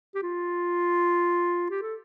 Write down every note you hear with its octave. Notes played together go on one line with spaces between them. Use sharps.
G4
F4
G4
A4